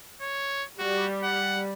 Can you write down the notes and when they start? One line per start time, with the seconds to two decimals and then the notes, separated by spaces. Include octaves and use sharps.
0.21 C#5
0.79 G3 F#4
1.23 F#5